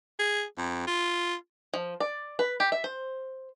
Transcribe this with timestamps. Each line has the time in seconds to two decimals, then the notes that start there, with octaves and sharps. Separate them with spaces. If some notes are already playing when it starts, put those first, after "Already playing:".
0.19 G#4
0.58 F2
0.87 F4
1.74 F3
2.00 D5
2.39 B4
2.60 G4
2.72 E5
2.84 C5